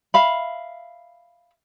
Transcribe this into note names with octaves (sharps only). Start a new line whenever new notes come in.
E5 F5 B5